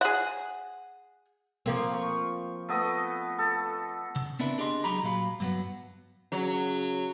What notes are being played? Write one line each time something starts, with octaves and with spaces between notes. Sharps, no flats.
G#4 F#5
F3 A#3 C4
C#6
A3 B3 D#5
A4
C#3
B3 C4 D4 E4 A#4 B4
D4 G4 G#4 D#5 C6
C#2 F#3 G4 G#4 A#5 B5
A#2 F#3 F5 B5
G2 F#3 B3
C#3 F#3